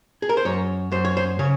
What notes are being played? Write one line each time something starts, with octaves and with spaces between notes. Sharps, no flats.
G#4
A#4
C5
F#2 C#5
F#2 C5
C#5
C5
C#3 C#5